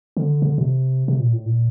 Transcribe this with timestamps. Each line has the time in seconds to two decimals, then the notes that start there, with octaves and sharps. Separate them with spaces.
0.17 D3
0.42 C3
0.46 D3
0.58 A#2
0.62 C3
1.08 C3
1.20 A#2
1.33 A2
1.46 A#2